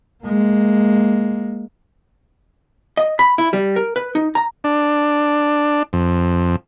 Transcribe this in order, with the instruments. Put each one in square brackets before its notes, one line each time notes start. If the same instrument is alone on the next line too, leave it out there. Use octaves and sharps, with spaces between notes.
[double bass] G#3 A#3
[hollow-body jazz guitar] D#5
B5
E4
G3
A#4
B4
D#4
A#5
[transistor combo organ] D4
F2